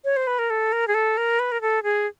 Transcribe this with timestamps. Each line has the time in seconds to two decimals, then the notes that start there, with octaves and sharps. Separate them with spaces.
0.04 C#5
0.17 C5
0.27 B4
0.39 A#4
0.50 A4
0.72 A#4
0.88 G#4
0.94 A4
1.17 A#4
1.39 B4
1.52 A#4
1.61 A4
1.83 G#4